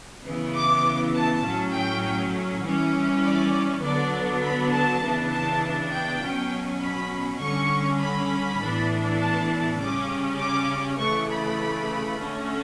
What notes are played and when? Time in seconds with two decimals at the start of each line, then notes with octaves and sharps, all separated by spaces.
0.24 C#3 E3 B3
0.54 D6
1.14 A5
1.43 A2 F#3 C#4
1.73 G5
2.63 E3 G3 C#4
3.22 D5
3.82 D3 F#3 B3 D4 D5
4.42 B5
4.71 A5
5.02 C#3 E3 B3 D4
5.31 A5
5.91 G5
6.21 B2 F#3 C#4
6.81 B5
7.40 D3 G3 C#4 C#6
8.01 B5
8.60 A2 E3 B3 D4
9.20 A5
9.79 C#3 G3 C#4 D6
10.38 D6
10.98 C#3 E3 A3 C#6
11.29 B5
12.19 D3 A3 C#4